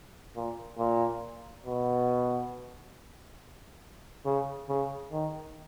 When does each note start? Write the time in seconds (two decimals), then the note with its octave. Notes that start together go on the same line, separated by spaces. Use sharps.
0.36 A#2
0.78 A#2
1.66 B2
4.25 C#3
4.69 C#3
5.12 D#3